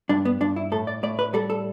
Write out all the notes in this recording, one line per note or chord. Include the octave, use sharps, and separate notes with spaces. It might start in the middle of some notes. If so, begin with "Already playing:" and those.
G2 D4
B3
G2 D4
E4
A2 A4
D5
A2 D5
B4
G3 A4
A4